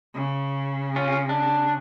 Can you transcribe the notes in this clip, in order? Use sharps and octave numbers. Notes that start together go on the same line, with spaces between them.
C#3
C#4 F4
D4